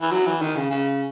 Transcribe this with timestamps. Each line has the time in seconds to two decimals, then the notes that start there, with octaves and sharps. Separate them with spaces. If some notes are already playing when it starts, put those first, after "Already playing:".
0.02 E3
0.11 F#3
0.26 E3
0.42 D#3
0.56 C#3
0.71 C#3